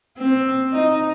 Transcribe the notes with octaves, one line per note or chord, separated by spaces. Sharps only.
C4
D#4